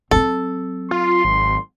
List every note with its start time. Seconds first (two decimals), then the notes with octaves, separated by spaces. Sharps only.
0.11 F#3 C4 A4
0.91 F4 C6
1.25 G#1